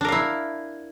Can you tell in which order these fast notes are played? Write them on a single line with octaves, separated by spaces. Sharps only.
D4 A#4 F5 E4